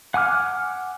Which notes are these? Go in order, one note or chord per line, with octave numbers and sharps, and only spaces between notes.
F#5 G#5 D6 F6